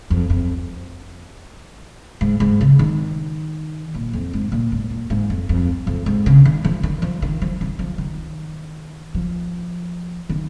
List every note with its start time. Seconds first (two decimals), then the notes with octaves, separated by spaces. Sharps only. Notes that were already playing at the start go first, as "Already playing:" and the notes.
0.10 F2
0.30 F2
2.21 G#2
2.40 G#2
2.61 C#3
2.79 D#3
3.95 A#2
4.13 F2
4.33 G#2
4.52 A#2
4.72 G#2
4.90 A#2
5.10 G#2
5.30 F2
5.49 F2
5.87 F2
6.06 G#2
6.26 C#3
6.45 D#3
6.65 F3
6.83 D#3
7.02 F3
7.22 D#3
7.42 F3
7.61 D#3
7.79 F3
7.98 D#3
9.14 F3
10.29 D#3